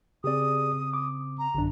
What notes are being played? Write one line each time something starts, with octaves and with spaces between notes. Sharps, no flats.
C#3 C4 G4 G#4 D5 D#6
D6
A#5
A1 F#2 D3 D4